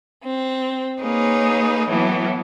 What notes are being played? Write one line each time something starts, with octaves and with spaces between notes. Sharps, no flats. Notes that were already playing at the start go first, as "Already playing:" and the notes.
C4
A#3 D#4 G#4 B4 C#5
A2 E3 F#3 B3